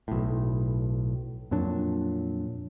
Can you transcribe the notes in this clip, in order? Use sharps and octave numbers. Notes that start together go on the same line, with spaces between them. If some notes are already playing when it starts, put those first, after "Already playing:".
B1 A2
F2 A#2 F#3 D4